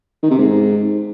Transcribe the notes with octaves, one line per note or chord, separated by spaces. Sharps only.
D#3
C3
G#2